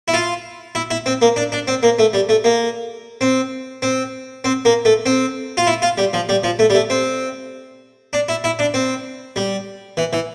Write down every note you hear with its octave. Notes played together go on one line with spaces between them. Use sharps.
E4
F4
E4
E4
C4
A#3
D4
D4
C4
A#3
A3
G3
A3
A#3
C4
C4
C4
A#3
A3
C4
F4
E4
F4
G3
F3
G3
F3
A3
G3
A3
C4
D4
E4
E4
D4
C4
G3
E3
E3